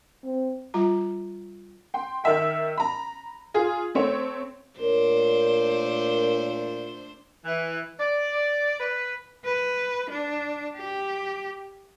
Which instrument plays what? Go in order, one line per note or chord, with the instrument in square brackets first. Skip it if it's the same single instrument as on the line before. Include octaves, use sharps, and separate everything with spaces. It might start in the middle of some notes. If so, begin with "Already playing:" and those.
[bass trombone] C4
[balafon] G3 F4 A#5
[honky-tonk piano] G5 C6
D#3 A#4 E5 G5
A#5 B5
F4 G#4
A3 C4 C#5
[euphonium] A#2 [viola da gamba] A3 D4 C5 [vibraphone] A#4 C#5
[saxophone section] E3
D5
B4
[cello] B4
D4
G4